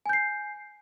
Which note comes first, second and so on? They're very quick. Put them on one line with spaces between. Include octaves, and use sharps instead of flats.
G#5 G6 C7